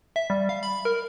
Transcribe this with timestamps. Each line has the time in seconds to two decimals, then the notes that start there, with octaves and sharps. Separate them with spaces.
0.16 E5
0.30 G3
0.49 F5
0.63 B5
0.85 A#4